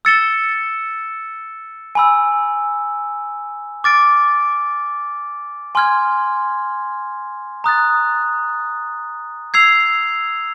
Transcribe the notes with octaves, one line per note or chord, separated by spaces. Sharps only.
E6 A6 C#7 E7 G7
G#5 B5 E6
D6 F6 A6 D7
G#5 C6 F6 G#6
A#5 D#6 F#6 A6
E6 G#6 C7 F7